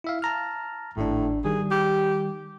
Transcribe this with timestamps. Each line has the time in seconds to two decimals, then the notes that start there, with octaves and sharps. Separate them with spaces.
0.04 E4 E5 F5
0.22 A5 A#5 F6
0.97 G#1 A2 D4
1.45 D#3 G3 G#4
1.71 G4